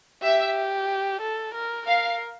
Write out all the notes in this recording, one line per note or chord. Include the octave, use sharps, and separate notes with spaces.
G4 E5
A4
A#4
A#4 F5